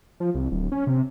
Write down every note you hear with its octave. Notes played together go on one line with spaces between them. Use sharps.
F3
C2
D1
C#4
C3